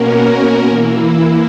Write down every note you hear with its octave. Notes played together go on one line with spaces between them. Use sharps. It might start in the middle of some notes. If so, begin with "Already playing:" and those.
Already playing: B2 A#3 C#4 F#4 A#4
E3 A#3 E4